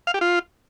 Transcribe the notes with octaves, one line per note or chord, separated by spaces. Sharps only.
F5
G4
F4